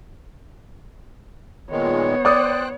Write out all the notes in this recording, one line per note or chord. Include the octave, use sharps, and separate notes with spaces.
A#2 D#3 G#3 B3 C#5
C5 D5 G5 D6 D#6 F#6